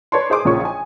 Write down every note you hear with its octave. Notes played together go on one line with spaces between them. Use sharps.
B4 C#5 D5 A5 C6
G#4 C5 C6 D6 D#6
A#1 A#2 C#3 F3 C#5 C#6
G#5